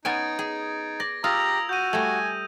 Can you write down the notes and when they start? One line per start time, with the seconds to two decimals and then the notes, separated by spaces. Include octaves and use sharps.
0.05 B3 C#4 D#4 G#5 G#6 A6 D7
0.39 G#4
1.00 D5 A#6
1.24 F4 G4 A#5 D#6 E6 F7
1.69 F#4 G6 D#7
1.93 G3 A3 G#5